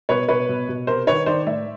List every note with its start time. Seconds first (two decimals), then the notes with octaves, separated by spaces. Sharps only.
0.09 B2 B4 C#5
0.28 B2 B4 C#5
0.49 B2
0.69 B2
0.87 C3 A#4 C5
1.07 D#3 B4 C#5
1.26 D#3 C5 D5
1.46 A2 D5 E5